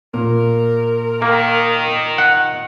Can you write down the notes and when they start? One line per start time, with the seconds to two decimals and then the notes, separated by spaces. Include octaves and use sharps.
0.14 A#2 A#4
1.22 D#3 A#3
2.18 F#5